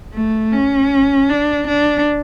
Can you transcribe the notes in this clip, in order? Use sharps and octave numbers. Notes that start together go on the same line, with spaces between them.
A3
C#4
D4
D4